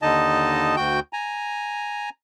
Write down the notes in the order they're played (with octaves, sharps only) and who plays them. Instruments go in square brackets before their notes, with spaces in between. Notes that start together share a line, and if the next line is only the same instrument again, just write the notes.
[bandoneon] D#2 D3 D#4 D#5 A5
D2 F#4 G5 G6
G#5 A#5